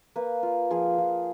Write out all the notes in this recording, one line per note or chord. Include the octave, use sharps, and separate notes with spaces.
A#3 B4
F4
F3 G#4
F3